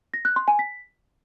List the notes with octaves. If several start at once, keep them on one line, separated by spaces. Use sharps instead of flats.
A#6
F#6
C6
G#5
B6